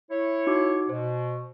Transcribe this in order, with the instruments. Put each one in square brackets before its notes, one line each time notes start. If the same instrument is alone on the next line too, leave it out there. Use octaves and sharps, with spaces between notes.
[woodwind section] E4 C#5
[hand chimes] D#4 F#4 D6
[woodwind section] B2 [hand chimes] C5